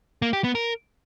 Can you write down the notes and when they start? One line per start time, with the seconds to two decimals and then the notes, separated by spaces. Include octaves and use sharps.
0.22 A#3
0.33 G4
0.44 B3
0.55 A#4